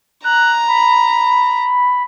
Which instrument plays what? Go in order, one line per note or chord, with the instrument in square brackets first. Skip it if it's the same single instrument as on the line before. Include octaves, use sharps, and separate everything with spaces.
[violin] A#5 [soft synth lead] F#6
[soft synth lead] B5